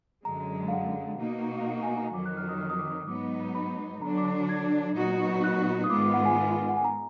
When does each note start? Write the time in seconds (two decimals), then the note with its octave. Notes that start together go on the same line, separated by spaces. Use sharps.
0.25 F#2 D3 G#3 A#5
0.68 F5
0.73 F#5
1.19 B2 A#3 D#4 F#4
1.58 F5
1.66 F#5
1.83 G#5
1.97 A#5
2.14 F2 D#3 F#3 D6
2.26 F#6
2.37 F6
2.49 D#6
2.61 F6
2.70 D#6
2.78 D6
2.88 D#6
3.08 G#2 F#3 B3 D#4 D6
3.55 B5
4.02 D3 F#3 D4 A#5
4.18 D6
4.49 G#6
4.96 A#2 F#3 B3 D#4 F#4
5.44 F#6
5.84 D#6
5.90 G#2 D#3 G#3 B3 F4 D6
6.02 D6
6.14 F#5
6.25 G#5
6.69 F#5
6.77 G#5
6.84 A#5